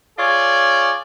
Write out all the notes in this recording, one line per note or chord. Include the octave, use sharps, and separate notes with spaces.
F4 G#4 C#5 D5